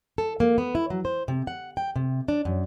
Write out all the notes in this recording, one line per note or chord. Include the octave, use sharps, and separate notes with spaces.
A4
A#3
B3
E4
F#3
C5
C3
F#5
G5
C3
D4
F#2